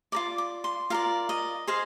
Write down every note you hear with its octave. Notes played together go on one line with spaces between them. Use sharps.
F4 A#4 D5 D6
D6
C6
F4 A#4 D5 F5
D#5
G#4 C5 D#5 F5